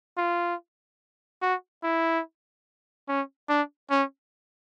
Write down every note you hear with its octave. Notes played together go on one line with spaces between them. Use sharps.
F4
F#4
E4
C#4
D4
C#4